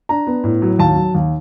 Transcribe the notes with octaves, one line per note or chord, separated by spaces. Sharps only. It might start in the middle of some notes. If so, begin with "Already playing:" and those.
D4 A#5
B3
A2
F#3
D#2 A5
F#3
D#2